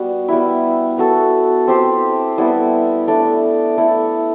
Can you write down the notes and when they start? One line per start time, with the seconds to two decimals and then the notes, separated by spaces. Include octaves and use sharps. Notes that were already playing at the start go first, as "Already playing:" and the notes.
Already playing: G3 B3 F#4
0.28 G3 B3 E4
0.98 B3 F#4 A4
1.67 C4 G4 C5
2.38 G3 B3 E4 A4
3.07 A3 D4 A4 D5
3.77 A3 E4 A4